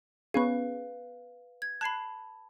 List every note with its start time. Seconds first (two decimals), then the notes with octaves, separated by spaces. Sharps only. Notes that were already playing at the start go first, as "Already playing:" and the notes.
0.34 B3 C#4 G#4 B4 F5
1.62 G#6
1.81 A5 B5 F#6 G#6 C7